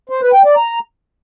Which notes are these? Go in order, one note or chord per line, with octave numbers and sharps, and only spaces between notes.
C5
B4
G5
D5
A#5